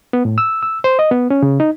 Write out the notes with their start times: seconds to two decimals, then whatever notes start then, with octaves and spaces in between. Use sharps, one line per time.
0.13 B3
0.25 A2
0.38 E6
0.63 E6
0.84 C5
0.99 D#5
1.11 B3
1.30 C#4
1.43 C#3
1.60 D#4